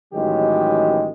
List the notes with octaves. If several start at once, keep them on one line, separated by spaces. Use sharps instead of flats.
A1 D#3 F#3 G#3 G4